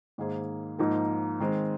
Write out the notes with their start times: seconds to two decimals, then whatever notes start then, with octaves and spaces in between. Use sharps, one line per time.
0.18 G#2 D#3 A#3 G#4 C5
0.79 G#2 F3 A#3 D#4 A#4
1.40 D#3 G#3 C4